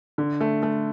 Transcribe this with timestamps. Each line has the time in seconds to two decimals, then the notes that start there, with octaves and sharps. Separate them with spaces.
0.18 D3
0.41 A3
0.63 A3